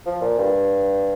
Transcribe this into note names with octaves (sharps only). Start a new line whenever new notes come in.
F3
A#2
G2